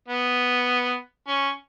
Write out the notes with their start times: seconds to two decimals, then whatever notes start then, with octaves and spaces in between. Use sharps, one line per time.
0.08 B3
1.27 C#4